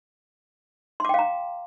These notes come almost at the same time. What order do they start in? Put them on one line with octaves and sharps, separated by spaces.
C6 D6 G5 F5 A#5